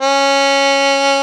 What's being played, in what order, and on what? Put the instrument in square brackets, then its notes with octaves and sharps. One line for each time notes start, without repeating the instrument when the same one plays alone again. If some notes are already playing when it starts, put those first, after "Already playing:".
[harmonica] C#4